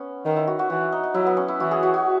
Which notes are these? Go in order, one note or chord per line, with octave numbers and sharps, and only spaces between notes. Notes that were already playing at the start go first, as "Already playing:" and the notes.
Already playing: B3 C#4
D#3 D#4
E4
F#4
F#4
E3 F#4
D#4
D#4
F#3 E4
B3
C#4
E4
E3 F#4
G#4
F#4
F#4